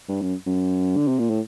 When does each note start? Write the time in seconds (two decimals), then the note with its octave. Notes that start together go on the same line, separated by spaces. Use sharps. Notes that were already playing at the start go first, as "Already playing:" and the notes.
0.08 G2
0.21 F#2
0.46 F#2
0.96 D3
1.08 C3
1.19 A#2
1.30 A2